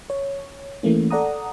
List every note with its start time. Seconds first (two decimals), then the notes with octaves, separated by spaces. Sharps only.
0.10 C#5
0.83 E3 A3 A#3 C#4
1.11 A4 D5 F#5 A#5 D#6